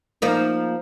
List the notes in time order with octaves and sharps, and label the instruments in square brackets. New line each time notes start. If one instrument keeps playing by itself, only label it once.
[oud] F3 A#3 D#4